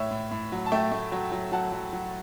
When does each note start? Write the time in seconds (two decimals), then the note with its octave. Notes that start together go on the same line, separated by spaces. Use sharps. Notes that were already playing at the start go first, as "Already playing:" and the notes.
Already playing: A2 C#5 E5
0.11 A2
0.31 A2
0.52 F#3
0.66 A5
0.72 A3 E5 G5
0.92 A3
1.12 F#3
1.32 F#3
1.52 F#3 F#5 A5
1.72 F#3
1.93 F#3